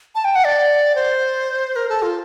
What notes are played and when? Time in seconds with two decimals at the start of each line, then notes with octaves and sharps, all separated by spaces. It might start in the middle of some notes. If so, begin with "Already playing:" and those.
0.15 A5
0.25 G5
0.35 F#5
0.45 D5
0.95 C5
1.76 A#4
1.89 A4
2.02 F4